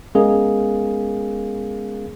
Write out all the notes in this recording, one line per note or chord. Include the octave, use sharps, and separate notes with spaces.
G#3 B3 C#4 G#4 A#4 F5